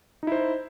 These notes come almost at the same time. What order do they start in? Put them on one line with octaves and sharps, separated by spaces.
D#4 E4 C5